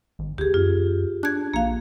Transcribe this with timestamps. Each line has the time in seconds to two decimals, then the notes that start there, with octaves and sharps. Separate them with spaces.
0.19 G#1
0.38 D2 G4 G#4
0.54 F#2 F4
1.23 D4 F#6 G#6
1.54 A#1 A#3 F5